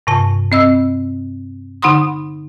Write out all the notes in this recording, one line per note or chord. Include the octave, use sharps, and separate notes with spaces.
G2 C3 A5
C4 D#5 E6
D3 D#4 F#5 B5 C6 D#6